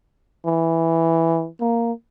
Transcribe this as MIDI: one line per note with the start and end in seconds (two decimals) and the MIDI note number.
0.46 1.48 52
1.60 1.92 58